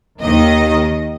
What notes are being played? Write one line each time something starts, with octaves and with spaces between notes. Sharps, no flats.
D#2 D#3 D#5